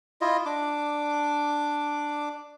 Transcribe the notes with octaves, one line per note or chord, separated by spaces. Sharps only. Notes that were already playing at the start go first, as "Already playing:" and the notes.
E4 F4 D#5
D4 D6